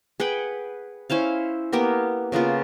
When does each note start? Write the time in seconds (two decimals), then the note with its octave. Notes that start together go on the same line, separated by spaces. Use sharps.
0.20 G#4 B4 F#5 G5
1.10 C#4 E4 C5 F5
1.72 A#3 B3 G4 A#4
2.32 C#3 A#3 B3 F4